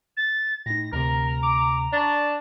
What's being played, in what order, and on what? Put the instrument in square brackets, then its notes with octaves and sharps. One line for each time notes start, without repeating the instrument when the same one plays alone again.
[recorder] A6
[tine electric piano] A2 D#4 [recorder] A#6
[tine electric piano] D2 C3 [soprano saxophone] A#4 [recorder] A#5
[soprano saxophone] D6
[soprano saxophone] D4 [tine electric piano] D5 C#6 [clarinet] A5